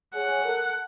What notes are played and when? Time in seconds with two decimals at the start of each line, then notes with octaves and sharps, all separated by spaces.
0.14 G#4 C#5 F#5
0.45 A4 A#4